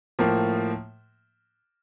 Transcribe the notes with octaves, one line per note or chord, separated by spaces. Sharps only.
A2 F3 A#3